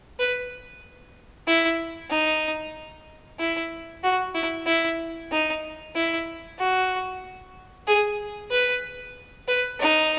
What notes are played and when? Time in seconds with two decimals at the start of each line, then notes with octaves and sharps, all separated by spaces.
0.19 B4
1.47 E4
2.11 D#4
3.40 E4
4.04 F#4
4.35 E4
4.67 E4
5.32 D#4
5.96 E4
6.59 F#4
7.87 G#4
8.51 B4
9.48 B4
9.80 D#4